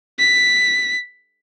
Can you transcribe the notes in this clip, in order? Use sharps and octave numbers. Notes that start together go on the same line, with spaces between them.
B6